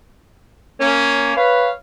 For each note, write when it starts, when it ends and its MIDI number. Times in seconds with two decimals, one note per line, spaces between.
0.80 1.32 58
0.80 1.32 61
1.36 1.70 71
1.36 1.70 73
1.36 1.70 77